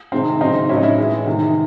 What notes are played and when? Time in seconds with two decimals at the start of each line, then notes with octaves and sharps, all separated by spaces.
0.12 C3 D#3 G#3 C4
0.40 C#3 F#3 C4 D#4
0.69 A2 F#3 C#4 E4
0.76 D#4
0.83 C#4 E4
0.98 A2 E3 G#3
1.26 C3 D#3 G#3